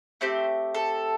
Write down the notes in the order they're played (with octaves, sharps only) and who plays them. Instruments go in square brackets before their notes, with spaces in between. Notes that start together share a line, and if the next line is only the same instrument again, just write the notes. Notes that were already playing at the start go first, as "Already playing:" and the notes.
[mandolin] A3 C4 G4 C5
A4